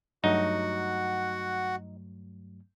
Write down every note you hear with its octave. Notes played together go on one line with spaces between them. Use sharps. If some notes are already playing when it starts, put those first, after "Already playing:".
G2 F#3 A3 D#4 F#4 F#5